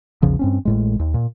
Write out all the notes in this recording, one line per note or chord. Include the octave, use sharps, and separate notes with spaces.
A#1 E2 C#3 F3
G2 C4 C#4
A1 A2 G#3
D#2
A#2